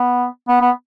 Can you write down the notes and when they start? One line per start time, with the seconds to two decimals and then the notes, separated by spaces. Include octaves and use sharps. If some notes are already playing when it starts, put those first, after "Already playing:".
Already playing: B3
0.48 B3
0.61 B3